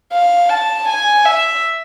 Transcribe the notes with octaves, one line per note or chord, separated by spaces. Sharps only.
F5
A5
G#5
E5